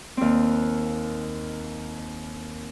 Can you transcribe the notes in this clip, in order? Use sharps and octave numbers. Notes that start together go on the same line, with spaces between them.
D#2 C4